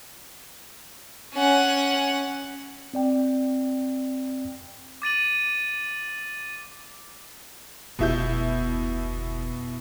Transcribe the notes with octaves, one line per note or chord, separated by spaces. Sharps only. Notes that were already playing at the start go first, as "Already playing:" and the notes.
C#4 F#5
C4 D5 G5
D6 A6 D#7 F#7
F1 D2 B2 E4 G6